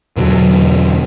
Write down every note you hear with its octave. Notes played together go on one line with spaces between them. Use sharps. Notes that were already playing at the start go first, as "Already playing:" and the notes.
E2 B2 D3 F#3